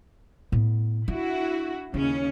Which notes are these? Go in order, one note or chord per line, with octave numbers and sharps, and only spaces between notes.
A2 B3
D4 E4 F#4
D#2 C#3 C#4 E4